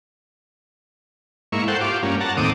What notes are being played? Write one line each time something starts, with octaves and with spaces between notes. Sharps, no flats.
G#2 A#3 E4 C#6
A4 C5 F#5 G5
F4 G4 D6
G2 A#3 C#4
F#5 A5 A#5
D#2 A2 C4 D6 D#6